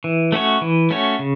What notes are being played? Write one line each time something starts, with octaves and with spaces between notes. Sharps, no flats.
E3
A3 C#4 F#4 C#5
E3
A3 C#4 F#4 C#5
C#3